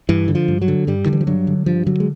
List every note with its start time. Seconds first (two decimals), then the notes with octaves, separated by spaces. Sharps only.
0.09 G2 E3
0.28 D3
0.35 F3
0.48 G2
0.62 F#3
0.68 D3
0.87 G2 G3
1.06 D3 D#3
1.13 E3
1.21 F3
1.27 G2 F#3
1.47 D3
1.66 G2 F3
1.86 D3 F#3
2.00 G#3